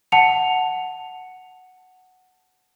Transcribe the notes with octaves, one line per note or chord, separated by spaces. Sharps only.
F#5 A5 C#7 F7